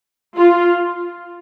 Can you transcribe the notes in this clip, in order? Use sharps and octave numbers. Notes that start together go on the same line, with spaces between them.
F4